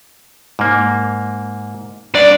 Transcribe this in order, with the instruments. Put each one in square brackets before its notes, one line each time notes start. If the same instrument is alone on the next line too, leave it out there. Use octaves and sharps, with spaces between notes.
[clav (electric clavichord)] G#2 A#3
[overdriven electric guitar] C2 D5 [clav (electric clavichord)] D4